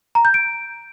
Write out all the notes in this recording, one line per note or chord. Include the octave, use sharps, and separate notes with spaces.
A#5
G6
D7